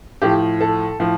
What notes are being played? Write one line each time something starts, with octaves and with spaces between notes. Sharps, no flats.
A2 F3 G4
A4
A2 F3